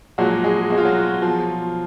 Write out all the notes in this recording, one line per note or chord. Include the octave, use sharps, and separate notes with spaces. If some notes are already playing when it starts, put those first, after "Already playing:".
A#2 F3 F#3 G#3 F#4
G#3 G#4
B2 G#3 F#4
F4
F#3 F#4
B2 F3 F#3 F4